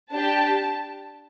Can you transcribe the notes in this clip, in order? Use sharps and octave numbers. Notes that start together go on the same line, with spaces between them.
D4 G4 A5